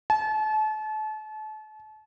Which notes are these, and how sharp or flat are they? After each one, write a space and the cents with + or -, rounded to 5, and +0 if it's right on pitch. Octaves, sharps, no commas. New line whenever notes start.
A5 -35